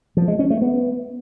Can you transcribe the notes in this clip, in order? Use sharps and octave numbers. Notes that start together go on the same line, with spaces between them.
F3
G#3
C#4
A3
B3